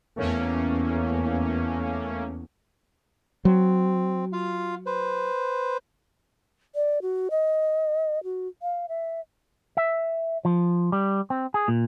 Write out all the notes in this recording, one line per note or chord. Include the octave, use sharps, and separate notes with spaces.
E2 A3 A#3 C#4
F#3 C4
F4 F5
B4 C5
D5
F#4
D#5
F#4
F5
E5
E5
F3
G3
C4
G#4
A#2